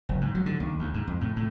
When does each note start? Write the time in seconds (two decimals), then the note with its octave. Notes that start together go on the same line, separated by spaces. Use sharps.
0.09 F#1
0.21 G#2
0.35 F#3
0.46 D3
0.60 D#2
0.79 D2
0.94 G#2
1.07 F2
1.21 A2
1.36 A2